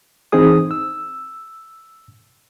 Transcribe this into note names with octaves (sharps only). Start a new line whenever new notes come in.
E3 C4 D#4 G#4 D#6
E6